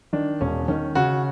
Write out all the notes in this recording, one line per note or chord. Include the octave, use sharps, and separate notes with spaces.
D#3 D4
E1 C#4
D#3 C#4
C#3 F#4